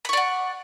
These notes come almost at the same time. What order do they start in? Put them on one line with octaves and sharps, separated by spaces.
B5 C#6 D5 F#5